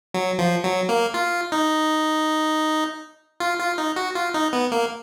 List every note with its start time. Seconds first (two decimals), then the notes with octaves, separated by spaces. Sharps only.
0.14 F#3
0.39 F3
0.64 F#3
0.89 A#3
1.14 F4
1.52 D#4
3.40 F4
3.59 F4
3.78 D#4
3.96 F#4
4.15 F4
4.34 D#4
4.53 B3
4.72 A#3